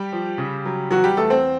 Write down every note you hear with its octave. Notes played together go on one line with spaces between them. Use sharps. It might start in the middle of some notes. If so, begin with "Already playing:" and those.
Already playing: G3 G4
F3
C#3
F#3
E2 F#3 F#4
G3 G4
E2 A3 A4
C4 C5